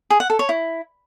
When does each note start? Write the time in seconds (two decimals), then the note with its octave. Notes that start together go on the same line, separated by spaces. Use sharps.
0.10 G#4
0.20 F#5
0.30 A4
0.39 C#5
0.49 E4